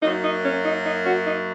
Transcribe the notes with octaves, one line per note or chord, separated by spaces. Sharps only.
F#2 F#3 A#3 D#4
D#4
C#4
D#4
D#4
C#4 F#4
D#4